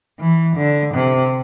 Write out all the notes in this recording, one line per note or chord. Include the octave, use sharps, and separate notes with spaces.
E3
D3
C3